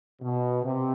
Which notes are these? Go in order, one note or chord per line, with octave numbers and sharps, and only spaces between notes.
B2
C3